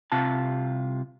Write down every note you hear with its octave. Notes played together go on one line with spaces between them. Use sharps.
C2 C3 F4 A5